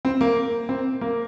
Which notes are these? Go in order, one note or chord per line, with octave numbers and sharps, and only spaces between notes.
C4
A#3
C4
A#3